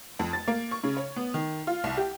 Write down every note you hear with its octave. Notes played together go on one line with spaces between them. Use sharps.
F2
A6
A#3
C#6
C#3
C#5
B3
D#3
F4
C2
G4